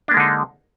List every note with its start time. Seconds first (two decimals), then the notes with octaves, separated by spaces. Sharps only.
0.08 D4
0.11 A#3
0.14 G#3
0.17 D3
0.20 D#4